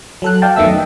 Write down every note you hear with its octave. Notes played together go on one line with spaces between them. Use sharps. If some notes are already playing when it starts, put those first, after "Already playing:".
F#3 A4 F#6
D5 F5 G5 A5
F#2 D#3 A3 B3 E5 E6
D#5